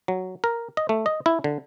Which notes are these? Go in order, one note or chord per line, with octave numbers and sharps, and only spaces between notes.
F#3
A#4
D#5
A3
D#5
E4
D3